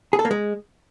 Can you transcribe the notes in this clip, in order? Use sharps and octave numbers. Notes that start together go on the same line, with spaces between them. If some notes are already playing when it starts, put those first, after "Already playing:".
G#4
A4
A#3
G#3